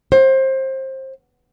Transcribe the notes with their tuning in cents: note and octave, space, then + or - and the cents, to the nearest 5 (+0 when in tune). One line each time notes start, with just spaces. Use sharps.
C5 +25 F#5 +0